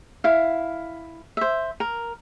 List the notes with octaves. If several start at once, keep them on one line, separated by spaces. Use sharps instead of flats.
E4 F5
C5 E5
A#4